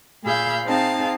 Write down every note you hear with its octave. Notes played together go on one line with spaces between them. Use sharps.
A#2 G#4 F5 B5 E6 G6
C4 D#4 G#4 F5 A5